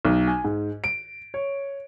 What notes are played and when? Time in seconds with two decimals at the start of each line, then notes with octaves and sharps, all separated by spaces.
0.05 B1
0.27 G#5
0.44 G#2
0.84 D7
1.34 C#5